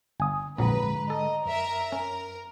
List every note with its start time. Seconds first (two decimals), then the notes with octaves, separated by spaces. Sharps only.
0.20 G1 G#5 D#6
0.58 A#1 F2 G#2 D3 F#3 G#3 B4 A#5
1.10 A4 D#5
1.46 F#2 A#4 E5
1.92 C#4 A#4